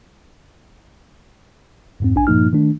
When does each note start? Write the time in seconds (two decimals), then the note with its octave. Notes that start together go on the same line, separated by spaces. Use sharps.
2.00 F2 G#2 C4
2.15 A#1 D4 G#5
2.27 G2 A#2 F3 A#3 D#4 F6
2.53 D#3 A3 D4